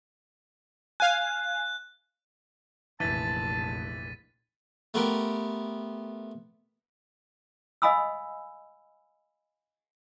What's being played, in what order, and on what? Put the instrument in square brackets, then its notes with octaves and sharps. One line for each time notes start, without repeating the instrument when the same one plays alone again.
[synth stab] F5 G#5 [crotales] F#6
[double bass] F1 A#1 [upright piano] E3 [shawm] A5 [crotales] A6 B6 D#7
[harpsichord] A3 B3 F4 G4 A#4
[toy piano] D#5 F5 G#5 B5 D#6 E6